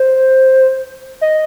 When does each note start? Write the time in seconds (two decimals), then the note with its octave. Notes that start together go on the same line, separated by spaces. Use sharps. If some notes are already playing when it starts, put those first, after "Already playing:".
Already playing: C5
1.21 D#5